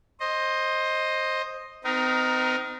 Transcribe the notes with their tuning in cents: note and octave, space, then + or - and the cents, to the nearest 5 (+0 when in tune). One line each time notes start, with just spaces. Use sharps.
C5 +15 D#5 +0
C4 -40 D#4 +0 A#4 +15